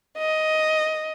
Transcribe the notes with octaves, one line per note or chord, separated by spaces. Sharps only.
D#5